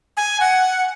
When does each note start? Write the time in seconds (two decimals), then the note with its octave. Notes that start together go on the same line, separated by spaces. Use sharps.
0.17 G#5
0.40 F#5